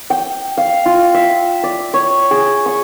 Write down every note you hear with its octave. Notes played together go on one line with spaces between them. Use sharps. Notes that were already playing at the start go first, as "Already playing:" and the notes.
G5
F5
F4
E5
D5
C#5
G#4
C#6